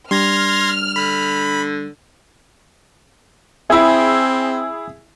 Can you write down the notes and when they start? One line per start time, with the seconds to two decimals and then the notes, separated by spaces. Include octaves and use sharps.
0.11 G3 D4 C6 F6 G#6 A#6
0.96 D3 B5
3.70 C4 E4 G#4 E5 B5